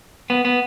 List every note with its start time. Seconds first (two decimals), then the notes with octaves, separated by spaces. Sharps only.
0.30 B3
0.45 B3